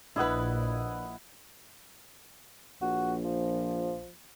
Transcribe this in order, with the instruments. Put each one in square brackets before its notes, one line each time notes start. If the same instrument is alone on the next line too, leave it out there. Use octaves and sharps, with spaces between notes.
[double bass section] A#1 [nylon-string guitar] D4 B4 [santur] E4 D#5 F#5
[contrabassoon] A#1 [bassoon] F#4
[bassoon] F3